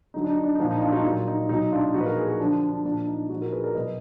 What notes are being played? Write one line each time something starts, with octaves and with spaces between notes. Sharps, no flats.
D3 F#3 D#4
D4
D#4
D4
D#4
A#2 F3 D4
D#4
D4 F4
D#4 F#4
A#2 F#3
D#4
B2 F#3 D#4
D4 F4
A#2 F3 D#4 F#4
B4
F#4 A#4
G#4 B4
F#4 A#4
D3 F3 D4
D4
A#2 F3 D4
D#4
A#2 F3 D#4 F#4
F#4 A#4
G#4 B4
A#4 D5
B2 F#3 B4 D#5